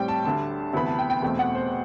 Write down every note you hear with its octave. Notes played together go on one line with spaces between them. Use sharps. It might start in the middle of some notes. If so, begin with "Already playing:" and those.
Already playing: A2 G3 C4 G5
A5
D2 D3 G3 A5
D2 C3 E3 B3 B5
A5
G5
G5
E2 B2 A3 C4 G5
F#5
C5